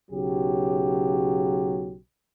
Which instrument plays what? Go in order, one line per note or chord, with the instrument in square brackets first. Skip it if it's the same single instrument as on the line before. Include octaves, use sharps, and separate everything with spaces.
[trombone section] B1 C#3 F#3 G4